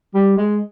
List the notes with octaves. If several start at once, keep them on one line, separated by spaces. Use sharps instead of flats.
G3
G#3